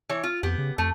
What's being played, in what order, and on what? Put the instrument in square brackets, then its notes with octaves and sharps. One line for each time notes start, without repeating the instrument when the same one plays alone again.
[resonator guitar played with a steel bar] E3 C#5
F4
[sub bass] F2 [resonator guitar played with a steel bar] B3 G4
[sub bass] C#3
[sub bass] F2 [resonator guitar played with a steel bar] A3